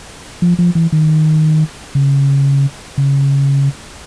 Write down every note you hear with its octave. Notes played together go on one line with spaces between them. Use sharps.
F3
F3
E3
D#3
C#3
C#3